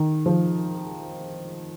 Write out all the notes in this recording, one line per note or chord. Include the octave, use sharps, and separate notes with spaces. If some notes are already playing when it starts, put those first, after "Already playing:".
Already playing: D#3
F3